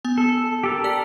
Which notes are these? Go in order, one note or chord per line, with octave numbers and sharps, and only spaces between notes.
B3 G#5
A4
G4 A4 A#4
D5 B6